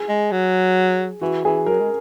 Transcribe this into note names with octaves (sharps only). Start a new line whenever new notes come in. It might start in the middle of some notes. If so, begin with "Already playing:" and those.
Already playing: G#4
G#3
F#3
E3 F#4
E3 G#4
F#3 A#4
G#3